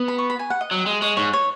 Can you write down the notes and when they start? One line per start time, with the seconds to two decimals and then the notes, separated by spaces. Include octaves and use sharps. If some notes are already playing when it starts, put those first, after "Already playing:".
Already playing: B3
0.08 B5
0.18 C#6
0.30 B5
0.39 G#5
0.50 F#5
0.61 D#5
0.71 F#3
0.86 G#3
1.02 G#3 C#5
1.17 G#2 C#5
1.33 C#5